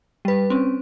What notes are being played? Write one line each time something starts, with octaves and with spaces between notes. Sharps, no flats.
G3 B4
C4 C#4